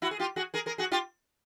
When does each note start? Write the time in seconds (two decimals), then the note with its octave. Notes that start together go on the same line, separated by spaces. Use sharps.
0.02 E4 F#4
0.11 G#4
0.19 F4 G4
0.36 F#4 G#4
0.54 G#4 A#4
0.66 G#4 A#4
0.78 F#4 G#4
0.92 F4 G4